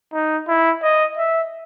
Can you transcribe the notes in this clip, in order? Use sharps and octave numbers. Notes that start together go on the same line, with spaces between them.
D#4
E4
D#5
E5